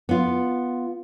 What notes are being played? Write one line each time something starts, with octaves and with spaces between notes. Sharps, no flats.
B3 F4